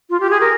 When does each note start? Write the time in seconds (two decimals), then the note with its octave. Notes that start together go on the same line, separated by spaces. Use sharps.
0.10 F4
0.20 G4
0.31 G#4
0.41 A#4